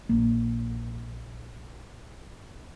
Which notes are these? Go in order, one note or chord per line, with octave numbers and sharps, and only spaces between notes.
A#1 A#3